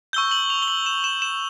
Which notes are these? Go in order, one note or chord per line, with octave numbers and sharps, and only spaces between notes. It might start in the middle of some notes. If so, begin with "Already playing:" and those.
C#6 E6 G6 G7
F#7
F7
G7
F#7
E7
E7
E7